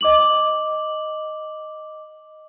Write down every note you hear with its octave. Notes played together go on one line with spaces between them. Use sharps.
D#5 D6 F#7